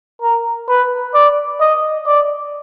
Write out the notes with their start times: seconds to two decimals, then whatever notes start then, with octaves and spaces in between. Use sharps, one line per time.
0.22 A#4
0.68 B4
1.14 D5
1.60 D#5
2.06 D5